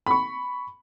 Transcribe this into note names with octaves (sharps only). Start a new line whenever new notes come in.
B5 C#6